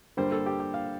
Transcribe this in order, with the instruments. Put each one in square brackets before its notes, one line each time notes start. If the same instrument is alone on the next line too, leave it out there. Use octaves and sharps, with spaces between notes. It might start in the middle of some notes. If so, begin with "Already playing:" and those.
[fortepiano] G2 D3 G3 A#3 C5
A4
G4
G4
F5